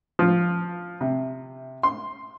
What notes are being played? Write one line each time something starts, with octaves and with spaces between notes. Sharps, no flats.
F3
C3
C6